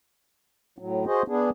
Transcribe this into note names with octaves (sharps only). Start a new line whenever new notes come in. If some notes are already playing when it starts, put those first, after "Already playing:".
A2 F#3
F#4 G#4 C5 D#5
B3 D4 G#4